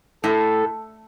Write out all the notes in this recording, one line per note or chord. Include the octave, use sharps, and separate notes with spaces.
A2 A4